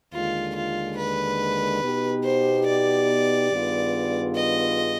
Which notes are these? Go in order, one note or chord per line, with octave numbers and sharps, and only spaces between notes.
D#2 D3 G#3 F4
F4
B4
B2 B3 D#4 G4
C5
D5
G2 D#3 B3 F4 G#4
D#5